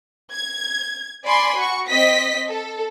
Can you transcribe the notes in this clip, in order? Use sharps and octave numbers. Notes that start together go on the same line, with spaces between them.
G#6
D5 G#5 B5 C6
F#4 C#6
C4 D#5 B6
A4